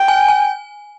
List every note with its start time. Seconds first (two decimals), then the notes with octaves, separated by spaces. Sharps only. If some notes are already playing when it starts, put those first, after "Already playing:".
Already playing: G5
0.08 G#5
0.28 G#5